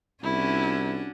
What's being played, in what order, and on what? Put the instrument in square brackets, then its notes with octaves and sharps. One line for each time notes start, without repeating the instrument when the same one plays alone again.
[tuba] C2 [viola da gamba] C#4 D4 F#4 [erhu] E4